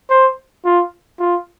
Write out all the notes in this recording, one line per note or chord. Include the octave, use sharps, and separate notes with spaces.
C5
F4
F4